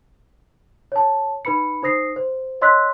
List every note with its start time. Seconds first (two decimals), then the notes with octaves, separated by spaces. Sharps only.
0.92 C#5 A5
1.45 D#4 B4 B5 C#7
1.83 D#4 C5 D#6 A#6 C7
2.16 C5
2.61 C#5 D#5 C6 E6 F#6 B6